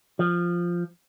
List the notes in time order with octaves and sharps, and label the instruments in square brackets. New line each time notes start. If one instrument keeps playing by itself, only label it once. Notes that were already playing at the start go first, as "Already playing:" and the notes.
[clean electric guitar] F3